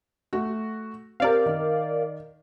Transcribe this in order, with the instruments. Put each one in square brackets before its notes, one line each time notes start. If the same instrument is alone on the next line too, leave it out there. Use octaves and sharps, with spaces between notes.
[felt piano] A3 F#4
[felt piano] C4 G4 [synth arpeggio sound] A#4 D5 F5
[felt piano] D#3